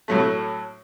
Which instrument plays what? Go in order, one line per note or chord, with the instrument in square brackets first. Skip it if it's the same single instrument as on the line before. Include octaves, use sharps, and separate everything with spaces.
[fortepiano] A2 F#3 A3